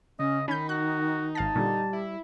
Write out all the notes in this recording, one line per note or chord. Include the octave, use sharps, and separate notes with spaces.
C#3 C#4 D#5
D#3 C#4 D#4 B5 G6
F#4 F#6
G#1 F5 A5 A#6
A#2 D3 G3
E4